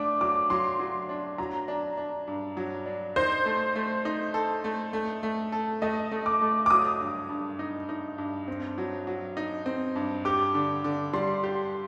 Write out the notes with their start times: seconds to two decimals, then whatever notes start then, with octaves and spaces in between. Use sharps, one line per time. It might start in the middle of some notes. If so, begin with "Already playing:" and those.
Already playing: A3 D4 D6
0.21 F#3 D6
0.50 F#3 C6
0.79 F#3
1.09 D4
1.38 F#3 A#5
1.68 D4
1.97 D4
2.27 G2
2.57 F#3
2.86 D4
3.16 D#4 C5
3.46 A3
3.75 A3
4.05 D#4
4.34 A4
4.64 A3
4.93 A3
5.23 A3
5.52 A4
5.82 A3 D#5
6.12 A3
6.26 D6
6.42 A3
6.66 D6
6.70 F#3 D#6
7.00 G2
7.29 G2
7.59 D#4
7.89 D#4
8.18 G2
8.48 C4
8.78 F#3
9.07 F#3
9.37 D#4
9.66 C4
9.96 G2
10.25 G4 D6
10.54 D3
10.84 D3
11.13 G3 C6
11.43 G4